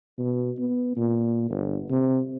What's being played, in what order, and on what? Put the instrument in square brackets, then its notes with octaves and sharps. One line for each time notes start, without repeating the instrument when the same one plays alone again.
[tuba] B2
B3
A#2
G1
C3